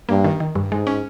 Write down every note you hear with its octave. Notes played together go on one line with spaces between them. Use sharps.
G2 A#3
D#3
D#3
G2
G#2 G#3
C#4